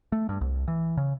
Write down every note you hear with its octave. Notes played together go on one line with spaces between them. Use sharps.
A3
G2
C2
E3
C#3